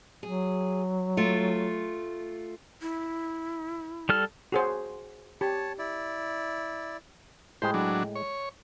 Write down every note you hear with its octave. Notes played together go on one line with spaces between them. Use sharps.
F#3 G#4
A3 F4
E4
G3 A4 F6
F#4 G#4 C5
G4 C#5 A5
E4 D5
A2 G#3 G4 C5 G5
F#3 D4
C#5